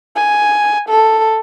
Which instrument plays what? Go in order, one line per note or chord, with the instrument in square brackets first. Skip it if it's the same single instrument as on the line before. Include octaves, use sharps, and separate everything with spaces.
[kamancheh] G#5
A4